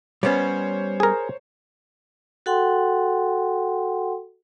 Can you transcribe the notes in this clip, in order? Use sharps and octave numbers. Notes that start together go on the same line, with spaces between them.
G3 B3 C#4 C5 C#5
G#4 A#4
F#4 A4 F#5 G5 C6